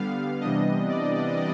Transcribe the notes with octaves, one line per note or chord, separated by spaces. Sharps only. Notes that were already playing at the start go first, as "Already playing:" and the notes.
Already playing: D3 G3 B3 F5
C3 E3 G3 B3 D4 D#5
D5